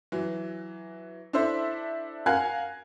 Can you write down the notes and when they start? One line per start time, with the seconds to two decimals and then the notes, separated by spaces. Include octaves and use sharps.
0.12 E3 F#3
1.33 D4 E4 A4 C5 E5
2.26 A#4 F5 F#5 G#5 F#6 G#6